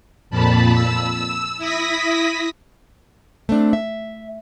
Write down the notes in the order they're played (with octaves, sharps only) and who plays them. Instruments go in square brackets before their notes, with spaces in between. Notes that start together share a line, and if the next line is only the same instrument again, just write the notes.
[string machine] F2 A#2 A5 B5
E6
E4 D#6 A#6 B6
[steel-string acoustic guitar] A3 C4 D4
E5